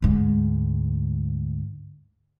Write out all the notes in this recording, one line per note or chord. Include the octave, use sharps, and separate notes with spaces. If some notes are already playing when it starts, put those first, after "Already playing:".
D2 G#2